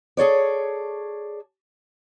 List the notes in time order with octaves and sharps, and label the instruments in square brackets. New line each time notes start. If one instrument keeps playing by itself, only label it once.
[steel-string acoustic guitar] G#4 A4 C#5 D5